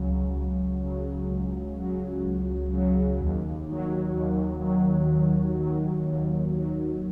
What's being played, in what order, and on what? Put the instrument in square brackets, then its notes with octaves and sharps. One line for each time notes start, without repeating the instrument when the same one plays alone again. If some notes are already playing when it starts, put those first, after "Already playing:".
Already playing: [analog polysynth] C#2 C#3 F#3
C#2
C#3 F#3
C#2
C#3 F#3
C#2
C#3 F#3
D#2
D#3 F#3
D#2
D#3 F#3
D#2
D#3 F#3
D#2
D#3 F#3